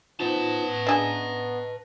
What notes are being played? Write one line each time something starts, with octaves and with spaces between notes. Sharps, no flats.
B3 D#4 F4 B4 C5 A5
D4 G#4 D#5 A#5